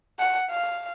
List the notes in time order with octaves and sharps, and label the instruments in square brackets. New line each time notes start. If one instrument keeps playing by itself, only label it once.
[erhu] F#5
F5